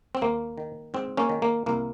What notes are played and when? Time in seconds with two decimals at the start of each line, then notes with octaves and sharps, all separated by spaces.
0.15 C4
0.21 D#2 A#3
0.57 D#3
0.94 G#2 C4
1.17 A#3 C#4
1.29 D#3
1.42 A#3
1.66 C2 A#3